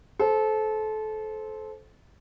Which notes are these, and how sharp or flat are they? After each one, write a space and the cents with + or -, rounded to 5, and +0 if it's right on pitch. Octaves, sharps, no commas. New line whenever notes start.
A4 -25 C5 +0